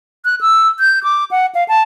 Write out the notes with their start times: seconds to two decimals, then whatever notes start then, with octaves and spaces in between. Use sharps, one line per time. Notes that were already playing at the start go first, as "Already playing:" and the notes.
0.25 F#6
0.41 E6
0.80 G6
1.04 D6
1.31 F#5
1.55 F5
1.68 A5